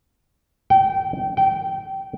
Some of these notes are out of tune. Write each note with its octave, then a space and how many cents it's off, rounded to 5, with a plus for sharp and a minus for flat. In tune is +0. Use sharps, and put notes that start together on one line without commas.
G5 -25
G5 -20